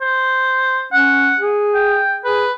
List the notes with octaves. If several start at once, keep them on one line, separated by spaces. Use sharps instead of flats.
C5
C#4 F#5
G#4
G5
G#4 B4